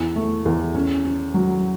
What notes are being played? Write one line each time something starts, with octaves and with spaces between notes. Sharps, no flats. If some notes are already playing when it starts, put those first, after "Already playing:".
Already playing: E2
A3
E2
C#4
C#4
F#3